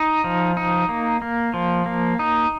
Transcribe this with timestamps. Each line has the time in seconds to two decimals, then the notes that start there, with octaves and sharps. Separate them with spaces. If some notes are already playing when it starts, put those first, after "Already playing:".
Already playing: D#4
0.24 F3
0.57 D#4
0.89 A#3
1.22 A#3
1.54 F3
1.86 A#3
2.19 D#4